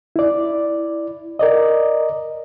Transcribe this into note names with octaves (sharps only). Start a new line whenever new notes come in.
E4 D5
A#4 D5 D#5